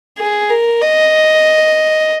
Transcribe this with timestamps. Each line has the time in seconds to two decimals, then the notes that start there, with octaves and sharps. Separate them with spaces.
0.18 G#4
0.50 A#4
0.81 D#5